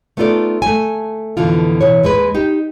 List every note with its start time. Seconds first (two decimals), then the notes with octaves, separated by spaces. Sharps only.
0.17 A3 B3 D#4 F4 A4 D5
0.62 A3 G#5
1.37 F2 B2 D3 E3 B3 F4
1.81 B2 E3 C#5
2.03 D#2 G#3 G#4 B4
2.35 D#4 G4